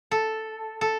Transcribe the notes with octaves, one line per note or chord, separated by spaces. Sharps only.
A4
A4